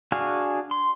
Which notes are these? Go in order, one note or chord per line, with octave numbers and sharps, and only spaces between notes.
D4 F#4 G#4 F5 G#5
C6